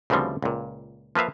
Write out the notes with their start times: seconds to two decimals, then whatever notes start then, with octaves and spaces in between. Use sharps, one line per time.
0.10 D2 C#3 E3 F3 G3 C4
0.42 C#2 A#2
1.15 F3 A#3 B4 E5 F5